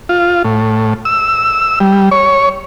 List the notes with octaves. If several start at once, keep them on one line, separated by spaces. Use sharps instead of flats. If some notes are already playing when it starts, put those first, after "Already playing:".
F4
A2
E6
G3
C#5